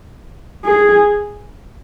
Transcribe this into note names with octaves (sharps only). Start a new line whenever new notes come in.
G#4